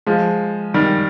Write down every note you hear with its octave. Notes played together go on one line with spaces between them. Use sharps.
F3 G#3
D#3 G3